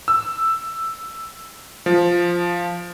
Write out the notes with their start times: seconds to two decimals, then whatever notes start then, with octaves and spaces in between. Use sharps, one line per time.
0.08 E6
1.86 F3